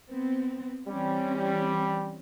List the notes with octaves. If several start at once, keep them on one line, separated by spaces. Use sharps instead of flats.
B3 C4
E3 G3 C4 C#4
G3